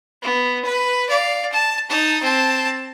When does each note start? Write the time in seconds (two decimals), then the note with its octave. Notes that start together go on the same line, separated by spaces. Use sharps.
0.22 B3
0.65 B4
1.09 D5 F5
1.52 A5
1.89 D#4 A5
2.22 C4 A5